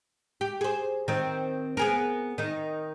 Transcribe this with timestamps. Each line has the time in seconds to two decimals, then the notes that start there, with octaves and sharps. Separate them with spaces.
0.41 G4
0.61 G#4 C5
1.08 D#3 C4
1.77 B3 G#4 A#4
2.38 D#3 D#4